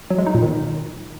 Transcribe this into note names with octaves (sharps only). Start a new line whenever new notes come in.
F#3
G#3
D#4
A#2
D#3